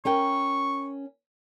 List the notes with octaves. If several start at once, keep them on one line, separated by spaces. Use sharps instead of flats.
C#4 A#4 G5 C#6